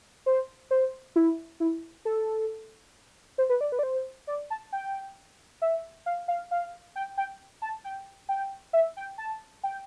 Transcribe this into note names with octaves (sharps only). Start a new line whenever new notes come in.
C5
C5
E4
E4
A4
C5
B4
D5
B4
D5
C5
D5
A5
G5
E5
F5
F5
F5
G5
G5
A5
G5
G5
E5
G5
A5
G5